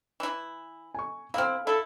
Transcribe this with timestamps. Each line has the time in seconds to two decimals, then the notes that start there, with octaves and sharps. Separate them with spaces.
0.20 E3 E4
0.94 G#5 C#6
1.34 C4 E4 F5 F6
1.67 E4 A4